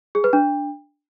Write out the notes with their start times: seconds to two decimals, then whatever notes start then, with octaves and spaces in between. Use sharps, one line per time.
0.15 G#4
0.24 B4
0.33 D4